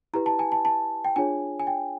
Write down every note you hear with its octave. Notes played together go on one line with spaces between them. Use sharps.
E4 G4 B4 A#5
A5
G#5
A5
A5
G5
D4 F4 G#4 C#5 G#5
G#5
G5